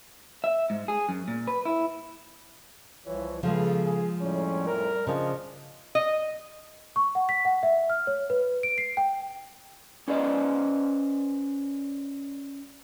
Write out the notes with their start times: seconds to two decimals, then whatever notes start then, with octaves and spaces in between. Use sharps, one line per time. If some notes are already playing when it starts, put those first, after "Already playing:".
0.44 E5
0.70 G#2
0.88 G#4
1.09 F#2
1.28 A#2
1.48 B4
1.65 E4
3.06 C2 E3 F3 C#5
3.43 C#3 F3 G#3 B3 A4 F5
3.84 G#4
4.21 F2 A2 G3 C#4
4.67 A#4
5.07 C#3 F3 D4 D#5
5.95 D#5
6.96 C#6
7.15 F#5
7.29 B6
7.45 F#5
7.63 E5
7.90 F6
8.07 C#5
8.30 B4
8.63 D7
8.78 C7
8.97 G5
10.08 C#4 B4 C5 D5 D#5